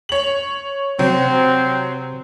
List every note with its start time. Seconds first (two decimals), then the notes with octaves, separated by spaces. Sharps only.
0.09 C#5 F#7
0.99 C3 F#3 C4 C5